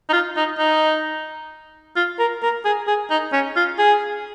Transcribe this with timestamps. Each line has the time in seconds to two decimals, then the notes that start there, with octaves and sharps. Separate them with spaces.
0.09 D#4
0.13 F4
0.36 D#4
0.59 D#4
1.96 F4
2.19 A#4
2.42 A#4
2.65 G#4
2.87 G#4
3.10 D#4
3.33 C#4
3.56 F4
3.79 G#4